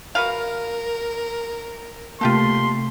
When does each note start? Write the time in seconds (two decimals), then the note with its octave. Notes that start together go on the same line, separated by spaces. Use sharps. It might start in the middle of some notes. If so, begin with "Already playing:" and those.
0.15 F#4 A#4 B4 F5
2.21 C3 A3 A#3 F4 G4 A4 C6